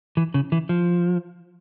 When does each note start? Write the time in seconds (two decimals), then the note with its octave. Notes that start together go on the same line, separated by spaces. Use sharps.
0.17 E3
0.34 C#3
0.52 E3
0.69 F3